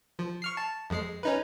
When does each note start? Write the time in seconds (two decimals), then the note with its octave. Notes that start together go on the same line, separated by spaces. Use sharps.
0.19 F3
0.42 C#6 F6 C7
0.57 A5
0.90 F2 G#3 C7
1.23 C#4 D#4 B4